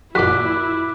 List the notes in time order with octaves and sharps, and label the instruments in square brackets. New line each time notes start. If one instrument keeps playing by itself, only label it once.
[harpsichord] F#2 A#2 [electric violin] E4 [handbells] D6 B6 [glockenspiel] F#6